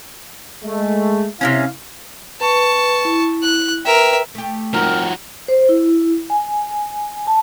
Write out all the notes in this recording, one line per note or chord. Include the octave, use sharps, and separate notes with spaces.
G#3 A3
C3 B3 C#4 E4 F5
B4 A5 C#6
E4
F#6
A#4 B4 E5 G5
A3 G4
G#2 F3 G3 C4 D#4 F#4 A#4
C5
E4
G#5
A5